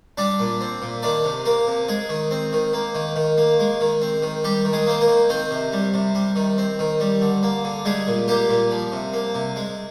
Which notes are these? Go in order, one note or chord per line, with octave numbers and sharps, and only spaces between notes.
G3 D4 D5
A#2
C4
A#2
D#3 D4 D5
C3
A#3 A#4
C3
G#3 G#4
D#3
C4
D#3
A#3
D#3
D#3
A#3
G#3
D#3
C4
D#3
G3 G4
D#3
G#3 G#4
A#3 C5
A#3 A#4
D#3
D#3 C4 C5
C3
G3
C3
G3
D#3
C4
D#3
G3
D3
A#3
D3
G3 G#3 G#4
A#2
G3 A#3 G4
A#2
F3
C3
A#3
C3
G#3